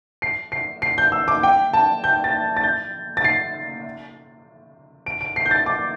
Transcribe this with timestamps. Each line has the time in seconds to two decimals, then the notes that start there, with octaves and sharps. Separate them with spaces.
0.22 C7
0.52 C7
0.82 C7
0.98 G6
1.12 E6
1.28 D6
1.43 G5
1.73 A5
2.04 G6
2.24 A6
2.57 A6
2.63 G6
3.17 A6
3.24 C7
5.06 D7
5.21 D7
5.36 C7
5.46 G6
5.51 A6
5.66 D6